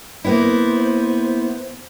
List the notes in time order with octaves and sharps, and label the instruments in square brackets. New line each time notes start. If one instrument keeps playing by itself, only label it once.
[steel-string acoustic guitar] A#3 B3 E4 [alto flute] C5